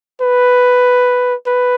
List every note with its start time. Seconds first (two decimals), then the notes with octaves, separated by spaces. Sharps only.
0.21 B4
1.47 B4